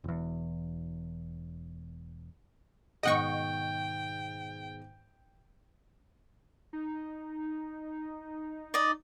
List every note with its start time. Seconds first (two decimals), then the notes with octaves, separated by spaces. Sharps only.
0.04 E1 E2
3.03 G#2 B2 D#3 D#5 F#5 G5 C#6
6.73 D#4
8.74 D5 D#5